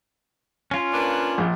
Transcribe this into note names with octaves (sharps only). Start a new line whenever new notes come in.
C#4 F4
A#3 D4 B4
A#1